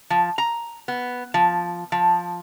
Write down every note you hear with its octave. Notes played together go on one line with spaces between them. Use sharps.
F3
A#5
B3
F3
F3